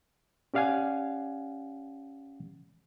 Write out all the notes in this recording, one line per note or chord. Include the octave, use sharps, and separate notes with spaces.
C#4 G4 D5 F5 F#5 G#5